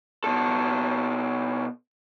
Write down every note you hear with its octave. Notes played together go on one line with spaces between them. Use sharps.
B2 A4